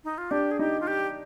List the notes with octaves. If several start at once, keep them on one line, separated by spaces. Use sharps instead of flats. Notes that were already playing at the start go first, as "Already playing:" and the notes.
D#4
F4
D4 G4
G#4
D#4 G4
F4
G4